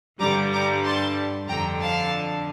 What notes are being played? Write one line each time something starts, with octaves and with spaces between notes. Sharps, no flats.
G2 D3 G3 A#5 D6
A#5 D6
A5 C6
F2 D3 F3 G5 A#5
F5 A5